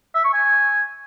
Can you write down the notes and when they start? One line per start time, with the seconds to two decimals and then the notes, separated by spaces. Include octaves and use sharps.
0.15 E5
0.24 C#6
0.34 G#5